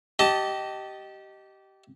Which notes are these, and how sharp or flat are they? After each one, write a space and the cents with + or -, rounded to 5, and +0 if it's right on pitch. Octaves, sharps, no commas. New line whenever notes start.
G4 -20 D#5 +0 A5 +0